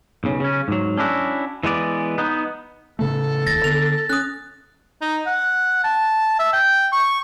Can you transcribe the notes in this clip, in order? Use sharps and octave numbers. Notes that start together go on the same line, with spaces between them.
B1 C#3
C#3 C#4
G#2 F#3
C#4 D4 E4 F#4
E3 G#3 B3 D5
B3 D#4
A2 C#3 A3 A4
D#1 C#2 D#3 A6 A#6
D3 B3 F7
C#4 D#6 F#6
D#4
F#5
A5
E5
G5
C#6